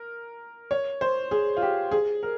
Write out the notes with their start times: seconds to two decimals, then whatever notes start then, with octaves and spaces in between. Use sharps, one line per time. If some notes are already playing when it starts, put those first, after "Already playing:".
Already playing: A#4
0.71 C#5
1.01 C5
1.31 G#4
1.57 F4
1.62 G4
1.91 G#4
2.23 A#4